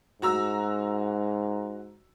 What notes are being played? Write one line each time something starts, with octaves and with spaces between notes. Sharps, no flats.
G#2 F#4 A#5 E6